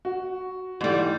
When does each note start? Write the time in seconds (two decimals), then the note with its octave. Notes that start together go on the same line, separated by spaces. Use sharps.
0.05 F#4
0.81 G#2 E3 G3 A3